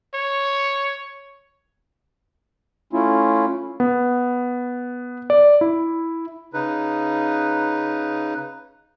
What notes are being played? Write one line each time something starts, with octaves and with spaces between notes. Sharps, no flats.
C#5
A3 C#4 E4 F4
B3
D5
E4
C#3 D#4 B4